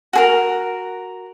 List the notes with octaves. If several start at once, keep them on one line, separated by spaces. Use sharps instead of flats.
F#4 G#4 A#4